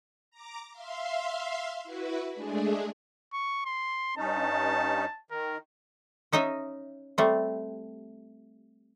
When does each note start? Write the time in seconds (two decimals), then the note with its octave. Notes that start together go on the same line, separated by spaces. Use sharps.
0.30 A#5 D6
0.71 E5 F5 C6
1.84 E4 F#4 B4
2.33 G#3 A3 D4 G#4
3.33 C#6
3.65 C6
4.17 G2 C#4 D#4 A5
5.31 D#3 A#4
6.32 C#4 D#4 D#5 E5
7.18 G3 A3 C4